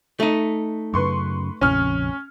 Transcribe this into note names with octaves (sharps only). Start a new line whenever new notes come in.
A3 D#4
F#2 C#3 B4 C6 C#6
A#1 F2 C#3 C#4 F6